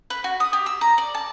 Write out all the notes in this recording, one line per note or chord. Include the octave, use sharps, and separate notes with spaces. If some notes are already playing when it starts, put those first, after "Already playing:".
B4
F#4
D#6
G4
E6
A#5
D5
A5